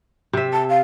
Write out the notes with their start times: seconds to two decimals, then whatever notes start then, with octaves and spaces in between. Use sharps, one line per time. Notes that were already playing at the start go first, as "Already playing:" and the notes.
0.33 C3 E5
0.53 A5
0.69 F5